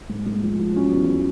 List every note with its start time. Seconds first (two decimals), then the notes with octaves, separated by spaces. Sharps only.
0.10 G#2
0.27 G#2
0.43 F3
0.59 F3
0.76 F#3 C#4
0.93 E2